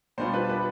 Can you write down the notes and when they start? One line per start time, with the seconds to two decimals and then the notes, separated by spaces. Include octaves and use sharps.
0.18 B2 G3 B3 D4 F4 C5
0.34 B4
0.49 B4